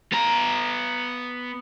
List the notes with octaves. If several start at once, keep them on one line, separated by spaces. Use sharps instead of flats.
B3 A#5